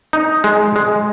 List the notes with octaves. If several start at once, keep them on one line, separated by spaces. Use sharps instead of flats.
D#4
G#3
G#3